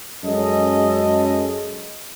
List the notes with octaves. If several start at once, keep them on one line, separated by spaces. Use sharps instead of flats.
F#2 G#3 C#4 A4 D#5